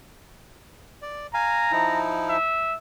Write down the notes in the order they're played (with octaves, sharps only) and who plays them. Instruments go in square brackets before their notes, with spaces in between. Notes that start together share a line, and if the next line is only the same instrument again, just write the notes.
[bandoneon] D5
[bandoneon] F5 G#5 [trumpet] A#5
[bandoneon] F3 D#4 E4
[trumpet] E5